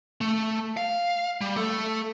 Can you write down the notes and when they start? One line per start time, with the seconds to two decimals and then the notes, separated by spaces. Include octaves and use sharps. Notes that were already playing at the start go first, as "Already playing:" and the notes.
0.21 A3
0.77 F5
1.41 G3
1.56 A3 A4